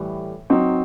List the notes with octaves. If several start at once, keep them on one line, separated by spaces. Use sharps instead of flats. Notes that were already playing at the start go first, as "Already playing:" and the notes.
Already playing: A2 E3 G3
F#3 C4 D#4